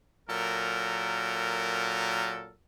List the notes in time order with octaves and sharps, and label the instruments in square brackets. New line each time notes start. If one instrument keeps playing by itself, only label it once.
[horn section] A#2 F#3 A4 A#4